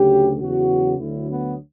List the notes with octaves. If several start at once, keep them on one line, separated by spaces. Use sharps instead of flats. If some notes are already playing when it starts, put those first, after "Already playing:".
Already playing: D2 C#3 F#3 G4
E2 C#3 F#3 F#4
D2 D3 F#3 E4
B3